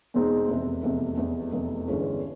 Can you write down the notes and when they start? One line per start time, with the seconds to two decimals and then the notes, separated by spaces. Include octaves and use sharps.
0.14 E2 B2 G#3 C4 D#4
0.48 F1 E2 C3
0.83 F1 E2 C3
1.17 F1 E2 C3
1.52 F1 E2 C3
1.88 G1 G2 E3 G#3 C#4